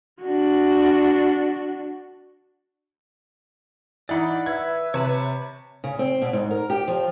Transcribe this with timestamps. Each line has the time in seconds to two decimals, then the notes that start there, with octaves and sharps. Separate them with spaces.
0.21 D4 F#4
4.09 E3 D#4 D5 F#5 B5
4.46 B4 E5 G#6
4.94 C3 C#5 A5 B5
5.84 C#3
5.99 C4
6.22 B2
6.33 G#2
6.51 A#4
6.70 G4
6.88 F3